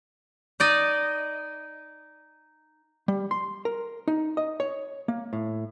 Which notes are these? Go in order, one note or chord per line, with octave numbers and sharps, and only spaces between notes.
D#4 D5 D#5
G3
C6
A#4
D#4
D#5
C#5
A#3
A2